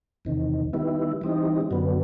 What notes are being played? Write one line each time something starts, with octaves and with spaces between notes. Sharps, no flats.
E2 C3 D#3
D#3 G3 B3 E4
E3 G3 C4 D#4
F#2 D3 F#3 B3